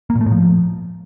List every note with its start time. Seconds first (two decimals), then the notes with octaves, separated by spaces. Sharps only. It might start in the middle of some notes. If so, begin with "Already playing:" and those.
0.10 A#3
0.15 A#2
0.21 A3
0.26 A2
0.32 F3